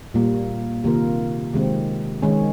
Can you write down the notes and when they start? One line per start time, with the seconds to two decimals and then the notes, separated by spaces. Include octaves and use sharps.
0.14 A#2 G3 A#3
0.84 C3 D#3 A#3 F4 A#4
1.54 C3 D#3 G#3 C4
2.22 D#3 G#3 C#4